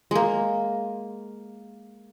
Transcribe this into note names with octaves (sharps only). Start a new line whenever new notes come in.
G#3 A#3